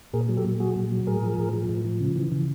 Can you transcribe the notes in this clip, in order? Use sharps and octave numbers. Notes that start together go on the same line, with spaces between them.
A#2 G#4 A#4
F#3
G4 A4
A#2
F#3 F#4 G#4
A#2
F#3
A2 G#4 A#4
F3
A2
F3
A2
F3
C#3
E3
C#3